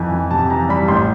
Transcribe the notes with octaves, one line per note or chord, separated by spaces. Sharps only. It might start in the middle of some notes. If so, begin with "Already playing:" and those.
Already playing: F2 E3 G#5
E3
C3 A5
E3 A#5
G3 B5
A1 C6